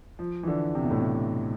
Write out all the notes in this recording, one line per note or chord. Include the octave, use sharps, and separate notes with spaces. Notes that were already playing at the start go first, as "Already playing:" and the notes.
F3
E3
D3
C3
B2
A2
B2